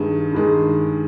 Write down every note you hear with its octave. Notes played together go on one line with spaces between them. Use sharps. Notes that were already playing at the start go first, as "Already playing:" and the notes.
Already playing: G2 D#3 G#3
G2 D#3 G#3